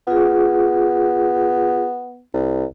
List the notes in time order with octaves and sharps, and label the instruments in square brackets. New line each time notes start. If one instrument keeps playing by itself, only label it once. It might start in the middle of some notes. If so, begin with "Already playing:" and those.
[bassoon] B3 [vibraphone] F4 G#4
[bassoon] C2